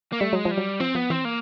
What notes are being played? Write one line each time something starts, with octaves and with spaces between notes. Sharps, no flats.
A#3
G3 A3
F#3 G#3
F3
G3
F#3
F3 C4
F3 B3
E3 C4
A#3